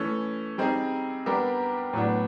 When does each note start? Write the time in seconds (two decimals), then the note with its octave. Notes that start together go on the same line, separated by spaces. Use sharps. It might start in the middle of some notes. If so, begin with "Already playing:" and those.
Already playing: E3 A3 C#4
0.58 G3 C4 D#4 G#4
1.26 G3 B3 D4 G4 A#4
1.93 A2 F#3 B3 D4